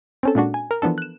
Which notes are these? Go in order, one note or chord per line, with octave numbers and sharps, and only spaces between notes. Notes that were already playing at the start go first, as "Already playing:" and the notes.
C4 C#4 A4
A#2 G#3 D4 F#4
G#5
A#4
E3 F3 B3 D4 A4
F#6 E7